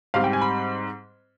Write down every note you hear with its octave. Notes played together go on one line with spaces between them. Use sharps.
G#2 G3 C4 F5
G5
G#5
B5